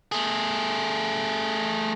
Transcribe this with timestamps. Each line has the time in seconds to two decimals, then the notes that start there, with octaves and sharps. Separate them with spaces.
0.12 A3 G#4